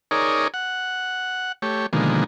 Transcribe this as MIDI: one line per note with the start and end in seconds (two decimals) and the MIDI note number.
0.11 0.48 63
0.11 0.48 68
0.11 0.48 70
0.11 0.48 73
0.11 0.48 74
0.54 1.52 78
1.62 1.86 57
1.62 1.86 67
1.62 1.86 73
1.93 2.24 47
1.93 2.24 50
1.93 2.24 51
1.93 2.24 53
1.93 2.24 56
1.93 2.24 58